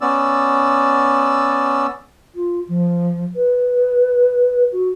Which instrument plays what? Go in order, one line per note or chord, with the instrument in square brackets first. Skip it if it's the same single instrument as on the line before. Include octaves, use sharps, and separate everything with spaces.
[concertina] B3 C#4 D5 E6
[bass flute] F4
F3
B4
F#4